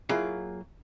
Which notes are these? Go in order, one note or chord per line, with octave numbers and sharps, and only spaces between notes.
F#3 A#3 E4 F4 G#4 F5